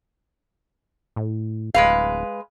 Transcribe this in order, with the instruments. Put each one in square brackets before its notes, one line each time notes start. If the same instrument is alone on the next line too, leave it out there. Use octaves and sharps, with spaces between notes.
[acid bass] A2
[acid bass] D1 [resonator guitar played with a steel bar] G#3 B4 F5